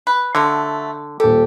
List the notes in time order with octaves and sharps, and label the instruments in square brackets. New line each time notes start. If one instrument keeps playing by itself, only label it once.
[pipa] B4
[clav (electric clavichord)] D3 [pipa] F#3 A3 F4
[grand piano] D#1 A4 [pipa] G4